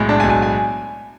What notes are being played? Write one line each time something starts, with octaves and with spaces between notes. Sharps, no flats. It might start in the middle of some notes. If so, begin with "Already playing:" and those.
Already playing: B1 A2 G#3
D4 A5
G#5
B1
G#5
G#5